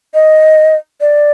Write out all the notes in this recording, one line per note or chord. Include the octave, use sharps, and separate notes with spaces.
D#5
D5